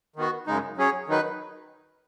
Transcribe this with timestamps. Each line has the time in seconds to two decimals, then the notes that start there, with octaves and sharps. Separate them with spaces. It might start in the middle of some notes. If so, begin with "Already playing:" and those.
0.16 D#3 B3 F#4
0.47 F#2 C#3 G#3 D#4
0.77 F#3 C#4 G#4 C#5
1.08 D#3 F#3 D#4 B4